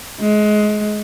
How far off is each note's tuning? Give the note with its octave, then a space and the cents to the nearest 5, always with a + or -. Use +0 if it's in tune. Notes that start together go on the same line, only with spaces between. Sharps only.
G#3 +25